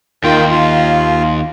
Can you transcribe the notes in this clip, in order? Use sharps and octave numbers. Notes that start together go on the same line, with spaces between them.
D#2 D#3 F4 G5
F4